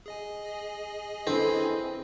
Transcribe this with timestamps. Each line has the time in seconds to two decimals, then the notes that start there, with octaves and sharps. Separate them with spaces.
0.06 G#4 D#5 G#5
1.27 C4 D4 E4 A4 B4 G5